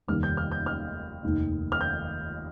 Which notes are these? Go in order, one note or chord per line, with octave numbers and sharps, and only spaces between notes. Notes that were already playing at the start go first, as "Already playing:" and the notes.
F1 D#2 D#3 G3 A#3 F6
G6
F6
G6
F6
F1 D#2 D#3
F6
G6